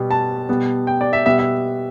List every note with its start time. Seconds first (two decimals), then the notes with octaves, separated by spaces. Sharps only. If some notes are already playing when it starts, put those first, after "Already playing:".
Already playing: B2 G3 B3
0.11 A5
0.49 B2 G3 B3
0.87 G5
1.01 D5
1.13 E5
1.26 B2 G3 B3 E5
1.39 E5